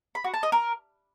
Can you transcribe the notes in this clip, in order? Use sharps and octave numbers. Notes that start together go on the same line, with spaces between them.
B5
F#4
A5
D#5
A#4